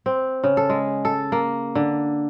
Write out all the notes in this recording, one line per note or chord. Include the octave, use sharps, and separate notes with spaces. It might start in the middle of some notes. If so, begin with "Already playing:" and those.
C4
C#3
A4
G#3
A4
A#3
D3